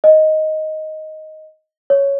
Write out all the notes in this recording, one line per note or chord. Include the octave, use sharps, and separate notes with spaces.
D#5
C#5